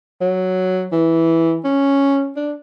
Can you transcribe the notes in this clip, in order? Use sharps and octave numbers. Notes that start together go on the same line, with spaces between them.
F#3
E3
C#4
D4